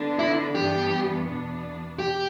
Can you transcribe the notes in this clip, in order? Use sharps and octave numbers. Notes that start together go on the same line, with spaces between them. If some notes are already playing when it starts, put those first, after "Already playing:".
Already playing: D3 B3 D4
E4
G2 E3 B3 D4 G4
E2 B2 B3 D4
G4